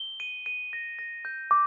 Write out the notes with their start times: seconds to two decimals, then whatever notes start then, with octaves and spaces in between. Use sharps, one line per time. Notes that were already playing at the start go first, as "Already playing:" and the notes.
Already playing: G7
0.20 D#7
0.46 D#7
0.73 A#6
0.99 A#6
1.25 G6
1.51 D6